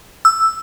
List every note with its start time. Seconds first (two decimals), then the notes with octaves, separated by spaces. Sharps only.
0.25 E6